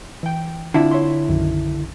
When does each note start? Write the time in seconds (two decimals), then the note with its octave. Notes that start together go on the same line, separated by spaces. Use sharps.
0.23 E3 G5
0.74 D3 C4 D4 E4 F4
0.91 C#5 E5 C6
1.29 B1 F#2 D#3